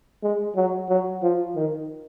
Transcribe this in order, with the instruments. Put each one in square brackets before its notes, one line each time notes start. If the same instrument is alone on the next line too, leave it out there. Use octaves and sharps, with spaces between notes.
[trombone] G#3
F#3
F#3
F3
D#3